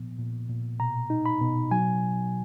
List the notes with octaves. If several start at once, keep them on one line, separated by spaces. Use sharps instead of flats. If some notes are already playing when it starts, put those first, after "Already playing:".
Already playing: A#2 F3 B3
A#2
A#2
B2 A#5
D#4
B5
B2
F#3 G#5